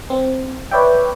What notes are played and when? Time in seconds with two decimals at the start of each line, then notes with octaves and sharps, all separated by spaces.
0.10 C4
0.71 B4 C#5 D5 E5 G5